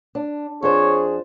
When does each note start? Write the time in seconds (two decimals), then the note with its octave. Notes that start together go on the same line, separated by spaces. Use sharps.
0.15 D4
0.63 F2 D4 G#4 C5 C#5